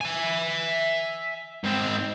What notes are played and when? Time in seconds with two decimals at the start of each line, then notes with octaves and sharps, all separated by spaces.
0.01 E5 G#5
1.64 G#2 C4